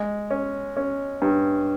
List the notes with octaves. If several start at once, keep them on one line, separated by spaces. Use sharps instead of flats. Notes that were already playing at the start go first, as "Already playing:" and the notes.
Already playing: G#3
C#4
C#4
G2